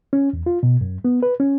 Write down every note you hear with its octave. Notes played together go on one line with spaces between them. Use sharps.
C#4
E2
F4
B2
F#2
B3
B4
C#4